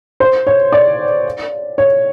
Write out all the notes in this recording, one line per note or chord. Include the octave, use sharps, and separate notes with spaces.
C5
C#5
D5
C#5